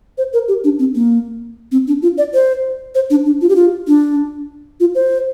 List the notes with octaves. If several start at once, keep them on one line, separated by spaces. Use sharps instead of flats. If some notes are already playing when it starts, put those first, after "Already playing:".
C5
A#4
G4
D4
C4
A#3
C4
D4
F4
D5
C5
C5
D4
D4
F4
G4
F4
D4
F4
C5